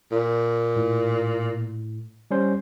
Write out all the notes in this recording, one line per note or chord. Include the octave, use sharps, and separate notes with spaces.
A#2
A2
G3 C#4 C5